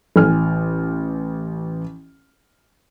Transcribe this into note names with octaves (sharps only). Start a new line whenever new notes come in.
A1 G#5 F6